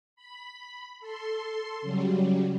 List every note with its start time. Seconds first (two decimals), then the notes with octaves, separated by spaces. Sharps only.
0.16 B5
1.00 A4 C6
1.82 C#3 F#3 G3